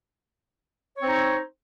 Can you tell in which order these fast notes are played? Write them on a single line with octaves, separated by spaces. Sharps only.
C#5 C4 D#4